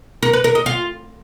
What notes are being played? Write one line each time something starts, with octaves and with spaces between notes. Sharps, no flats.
A#4
B4
A#4
D#5
F4